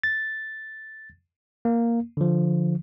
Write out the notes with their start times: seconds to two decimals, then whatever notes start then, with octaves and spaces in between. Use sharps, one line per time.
0.03 A6
1.65 A#3
2.17 D3 F3